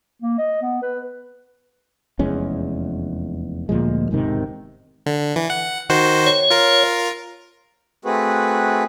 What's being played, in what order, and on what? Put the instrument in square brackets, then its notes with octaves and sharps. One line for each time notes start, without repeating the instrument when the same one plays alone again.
[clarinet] A#3
D#5
B3
B4
[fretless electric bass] F1 E2 G#3 C#4
D2 A#2 F3 G#3
E1 G#2 C3 D#3
[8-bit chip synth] D3
E3
F#5
D#3 F#4 C5
[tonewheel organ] C#5
[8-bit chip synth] F4 A#4
[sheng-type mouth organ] A3 C4 F#4 G#4 B4